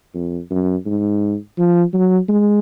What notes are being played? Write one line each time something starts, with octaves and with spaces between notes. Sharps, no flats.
F2
F#2
G#2
F3
F#3
G#3